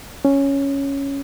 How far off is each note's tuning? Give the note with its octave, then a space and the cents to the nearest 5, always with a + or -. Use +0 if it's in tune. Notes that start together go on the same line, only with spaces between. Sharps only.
C#4 +0